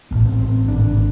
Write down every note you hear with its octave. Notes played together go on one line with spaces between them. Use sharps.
A1 A2 B3
C4
C4
G#1 G#2 D4
D4